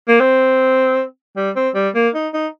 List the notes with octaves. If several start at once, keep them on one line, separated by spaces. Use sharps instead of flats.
A#3
C4
G3
C4
G3
A#3
D#4
D#4